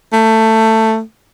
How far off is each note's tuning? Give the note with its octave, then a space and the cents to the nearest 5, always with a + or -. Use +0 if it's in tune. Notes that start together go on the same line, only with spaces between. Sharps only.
A3 +15